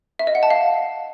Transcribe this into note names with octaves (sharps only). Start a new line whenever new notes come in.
E5
D#5
F#5
A5
F5